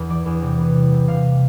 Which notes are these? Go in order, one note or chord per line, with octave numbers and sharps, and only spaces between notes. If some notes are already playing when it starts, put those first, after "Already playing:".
Already playing: E2 B4
E3 D5
E2
C3
B3
G3
C3
C3 F5